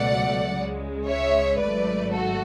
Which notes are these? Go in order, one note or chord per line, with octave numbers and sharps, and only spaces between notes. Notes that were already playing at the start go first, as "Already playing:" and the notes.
Already playing: C#2 B2 F#3 A3 D5 F#5
C#2 C#3 G#3
C#5 E5
G#1 G#2 F#3 A3 B4 D5
F#4 A4